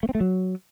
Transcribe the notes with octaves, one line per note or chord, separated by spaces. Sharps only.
A3
C4
A3
F#3